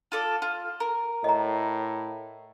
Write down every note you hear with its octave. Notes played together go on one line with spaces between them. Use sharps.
F4 A4 D5
F4
A#4
A2 D#5 A#5